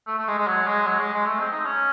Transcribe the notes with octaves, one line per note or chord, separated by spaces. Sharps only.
A3
A3
G#3
G#3
F#3
G#3
F#3
G#3
G#3
A3
C4
D#4
C#4